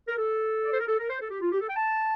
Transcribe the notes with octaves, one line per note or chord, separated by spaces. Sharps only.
A#4
A4
D5
C5
A#4
A4
A#4
C5
A4
G4
F4
G4
A4
G5
A5